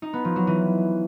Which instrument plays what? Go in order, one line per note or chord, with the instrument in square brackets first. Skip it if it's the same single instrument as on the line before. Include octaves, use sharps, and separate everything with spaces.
[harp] D#4
B3
F3
F#3
E3